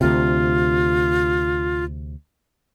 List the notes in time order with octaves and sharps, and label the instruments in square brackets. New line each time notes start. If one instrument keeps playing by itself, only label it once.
[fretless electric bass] D2 C3 [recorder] F4